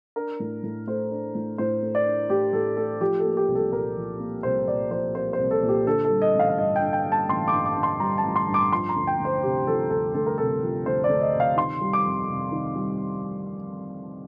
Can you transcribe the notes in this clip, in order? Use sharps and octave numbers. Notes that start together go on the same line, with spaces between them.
D4 A#4
A2
A2
A3 C5
D4
A2
A2 C5
A3
D5
D4
A2 G4
A2 A4
A3 A4
F3 G4
A4
A#3
G4
C2
A4
A#2 A#4
F3
A#3
C2 C5
A#2 D5
F3 C5
A#3 C5
C5
C2
A4
A#2
G4
D3 A4
A4
G3
D#5
A1 F5
F5
G2 D#5
G5
D3
G5
G3
A5
A1 C6
D6
G2
D6
D3
C6
G3 A#5
A5
A1
C6
G2
D6
F3 C6
A#5
D2
G5
D2
C5
C3 G4
F3 A4
D2 A4
D2 A4
A#4
C3 A4
F3
D2 C5
D5
D2
D#5
C3
F5
D#3 C6
G3
D6
F2
C3
D#3
G3